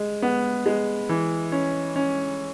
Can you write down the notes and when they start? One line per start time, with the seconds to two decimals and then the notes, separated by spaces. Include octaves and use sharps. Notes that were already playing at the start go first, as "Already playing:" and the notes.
Already playing: G#3
0.22 B3
0.66 G#3
1.09 E3
1.52 C#4
1.96 C#4